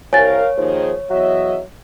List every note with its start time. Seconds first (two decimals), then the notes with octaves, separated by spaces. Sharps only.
0.13 C2 A#4 C#5 F5 G#5 A6
0.58 D#2 D#3 F3 G#4
1.10 E2 F#3 D#5 E5